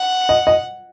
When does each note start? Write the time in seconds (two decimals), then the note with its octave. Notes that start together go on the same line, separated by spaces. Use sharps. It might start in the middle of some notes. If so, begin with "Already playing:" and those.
Already playing: F#5
0.29 D#5
0.47 D#5